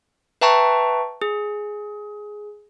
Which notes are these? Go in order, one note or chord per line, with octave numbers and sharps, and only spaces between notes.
B4 E5 G5 A5 A#5 C#6
G#4